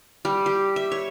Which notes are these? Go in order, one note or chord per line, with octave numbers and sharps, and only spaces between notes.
G3
G4
E5
C#5